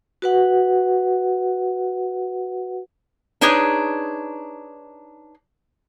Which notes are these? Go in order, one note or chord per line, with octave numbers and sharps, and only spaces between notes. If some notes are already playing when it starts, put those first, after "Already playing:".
F#4 B4 F#5
D4 D#4 G#4 B4 C#5